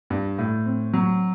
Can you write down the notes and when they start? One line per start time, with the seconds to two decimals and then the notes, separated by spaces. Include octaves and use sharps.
0.10 G2
0.39 A2
0.66 C4
0.94 F#3